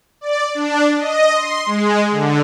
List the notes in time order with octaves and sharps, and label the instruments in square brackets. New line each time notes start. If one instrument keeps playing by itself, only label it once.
[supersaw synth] D5
D4
D#5
C6
G#3
D3